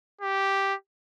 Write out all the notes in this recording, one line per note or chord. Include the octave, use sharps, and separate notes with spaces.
G4